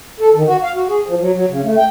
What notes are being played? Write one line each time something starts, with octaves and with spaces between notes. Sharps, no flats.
A4
D#3
F#4
F5
F#4
G#4
F3
F#3
F#3
C#3
A3
G5